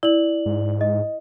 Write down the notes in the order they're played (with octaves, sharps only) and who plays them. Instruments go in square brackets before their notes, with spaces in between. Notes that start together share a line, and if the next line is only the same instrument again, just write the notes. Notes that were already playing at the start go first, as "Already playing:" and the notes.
[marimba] E4 [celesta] D5 F#7
[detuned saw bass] G#2
[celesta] D#5